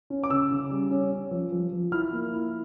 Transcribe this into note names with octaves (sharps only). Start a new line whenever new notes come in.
C#4
D6
C#3 E6
C#3
G3
C#4
C#4
F3
F3
F3
E4 F6
A#3
E4